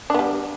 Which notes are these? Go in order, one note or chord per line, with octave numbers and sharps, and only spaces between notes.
G3 B3 D4